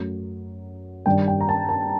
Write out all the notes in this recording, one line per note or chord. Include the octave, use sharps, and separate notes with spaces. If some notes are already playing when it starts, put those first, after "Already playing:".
Already playing: F#2 F#3 A3
G2 D#3 G3 D4 G5
G5
A#5
A5
A5